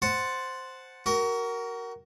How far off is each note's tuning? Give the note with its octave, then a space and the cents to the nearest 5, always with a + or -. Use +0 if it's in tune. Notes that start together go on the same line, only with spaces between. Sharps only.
C5 +0 F#5 +0 A5 +0
F#4 +30 A#4 +0